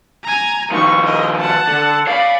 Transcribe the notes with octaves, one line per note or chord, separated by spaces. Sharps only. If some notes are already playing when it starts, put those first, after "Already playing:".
G#5 A#5
D#3 F3 D#4 C#6
A#4 D#5
F#5 A5
D3
C#5 D5 F5 B5